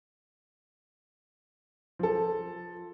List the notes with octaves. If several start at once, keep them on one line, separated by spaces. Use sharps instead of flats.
F3 A4